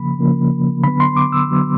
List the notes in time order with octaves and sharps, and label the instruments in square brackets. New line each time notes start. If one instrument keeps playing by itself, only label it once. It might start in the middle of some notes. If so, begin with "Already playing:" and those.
Already playing: [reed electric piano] C#3 F3 A#3 B5
C#3 F3 A#3
D3 F#3 B3 B5
C6
D6
E6
D3 F#3 B3